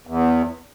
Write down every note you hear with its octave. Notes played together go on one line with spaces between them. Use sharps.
E2